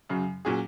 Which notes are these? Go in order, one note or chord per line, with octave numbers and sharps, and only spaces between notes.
F#2 C#3 F#3
A#2 F#3 C#4 G#4